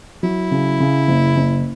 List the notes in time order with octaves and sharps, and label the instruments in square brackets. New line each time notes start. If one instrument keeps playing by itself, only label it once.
[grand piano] F#3 [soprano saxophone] E4
[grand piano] C#3
C#3
F#1
F#1